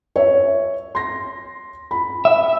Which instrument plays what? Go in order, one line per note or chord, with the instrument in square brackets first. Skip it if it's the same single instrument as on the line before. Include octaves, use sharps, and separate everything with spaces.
[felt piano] C#5 E5
C6 A#6
B5
[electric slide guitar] E5